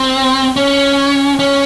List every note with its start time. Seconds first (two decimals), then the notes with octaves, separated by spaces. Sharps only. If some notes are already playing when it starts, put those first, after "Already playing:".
Already playing: C4
0.57 C#4
1.39 C#4